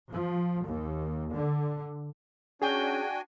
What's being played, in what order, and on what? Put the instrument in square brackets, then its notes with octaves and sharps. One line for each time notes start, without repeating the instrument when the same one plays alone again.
[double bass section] F3
D#2
D3
[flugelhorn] C#4 [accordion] D4 F#4 G#5 [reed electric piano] G#4 [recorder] G5